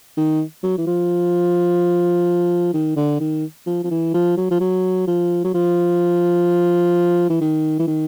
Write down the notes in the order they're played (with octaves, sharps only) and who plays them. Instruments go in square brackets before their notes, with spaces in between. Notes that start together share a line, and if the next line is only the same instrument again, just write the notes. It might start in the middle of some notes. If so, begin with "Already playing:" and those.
[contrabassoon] D#3
F#3
E3
F3
D#3
D3
D#3
F3
F3
E3
F3
F#3
F3
F#3
F3
F#3
F3
E3
D#3
E3
D#3